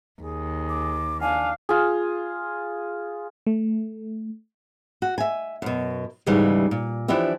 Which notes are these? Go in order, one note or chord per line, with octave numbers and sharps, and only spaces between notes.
D#2 G#4
D6
D4 F5 G#5
F4 G#4
A3
F#4
E5 G#5
F#2 B2
D#2 G#2 C#3 E3 G3
A#2
E3 F3 D4 E4 G4 E5